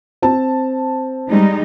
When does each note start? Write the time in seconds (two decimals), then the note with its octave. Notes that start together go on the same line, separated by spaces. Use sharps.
0.22 C4 A5
1.31 G3 G#3 D#4